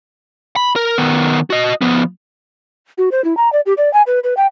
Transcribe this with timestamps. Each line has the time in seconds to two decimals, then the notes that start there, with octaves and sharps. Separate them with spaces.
0.56 B5
0.76 A#4
0.98 D#3 B3
1.50 F#4 D#5
1.81 F3 B3
2.98 F#4
3.12 C5
3.24 E4
3.37 A#5
3.52 D5
3.66 G4
3.77 D5
3.93 G#5
4.07 B4
4.24 B4
4.37 G5